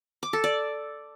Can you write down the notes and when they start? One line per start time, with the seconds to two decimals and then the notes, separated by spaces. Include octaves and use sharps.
0.23 D6
0.33 A4
0.44 D5